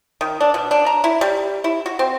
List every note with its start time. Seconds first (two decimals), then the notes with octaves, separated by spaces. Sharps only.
0.21 D#3
0.40 D4
0.54 B2
0.71 D4
0.86 A#5
1.04 E4
1.21 G3
1.64 E4
1.86 F#4
1.99 C4